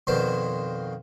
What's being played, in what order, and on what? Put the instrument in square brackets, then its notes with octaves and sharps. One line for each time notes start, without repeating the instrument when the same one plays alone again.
[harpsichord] F2 B2 D#3 D4 C5